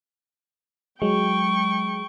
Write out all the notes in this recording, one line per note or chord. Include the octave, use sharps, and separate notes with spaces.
F#3 G#3 G5 C#6